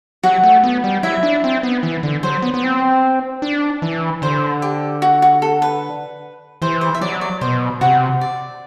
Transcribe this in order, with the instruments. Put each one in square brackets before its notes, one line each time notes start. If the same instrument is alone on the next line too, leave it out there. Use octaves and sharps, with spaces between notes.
[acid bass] F#3 [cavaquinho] F#4 F#5
[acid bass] A3
B3
G3
[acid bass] F#3 [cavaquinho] E4 E5
[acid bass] D4
C4
B3
E3
D3
[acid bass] F#3 [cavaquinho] C5
[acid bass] B3
B3
C4
D4
E3
[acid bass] D3 [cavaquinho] C5
[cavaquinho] G4
F#4
F#4
A4
B4
[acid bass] E3 [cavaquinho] C5
[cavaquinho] C5
E5
[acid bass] F#3 [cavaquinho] D5
[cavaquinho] D5
[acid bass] B2 [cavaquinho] C5
[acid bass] C3 [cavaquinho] F#4 F#5
[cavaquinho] D5